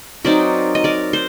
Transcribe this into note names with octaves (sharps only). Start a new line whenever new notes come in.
F#3 C4 D#4 A#4 D5
D#5
A#4 D5
C5